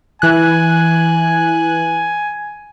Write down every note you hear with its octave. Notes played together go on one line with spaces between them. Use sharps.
E3 G#5 F#6